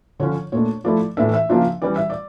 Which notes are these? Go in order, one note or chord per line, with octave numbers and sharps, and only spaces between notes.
D3 F3 C#4 F4 C#5
A#2 A3 D4 C#5
F3 A3 E4 D5
A2 E3 A3 D4 E5
E5
C#3 F3 A#3 D4 F4
E3 G3 C#4 D5
E5
D5